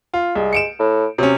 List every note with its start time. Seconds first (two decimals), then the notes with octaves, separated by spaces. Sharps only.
0.14 F4
0.35 C2 G#3
0.53 C#7 D7 E7
0.79 A2
1.18 C3 F#3 C#4